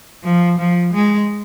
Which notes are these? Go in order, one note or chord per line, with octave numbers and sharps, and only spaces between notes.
F3
F3
G#3